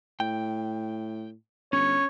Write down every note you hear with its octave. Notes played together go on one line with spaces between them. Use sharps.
A2 G5
G1 C#4 C#5